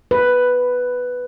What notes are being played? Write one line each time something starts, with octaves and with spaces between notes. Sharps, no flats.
B4